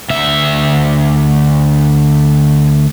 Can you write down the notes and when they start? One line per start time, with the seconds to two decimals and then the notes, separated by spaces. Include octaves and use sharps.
0.10 D2 E5